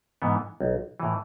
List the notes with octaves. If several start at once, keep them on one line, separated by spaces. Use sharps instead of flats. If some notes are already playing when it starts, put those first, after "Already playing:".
G#2 E3 B3
B1
A2 E3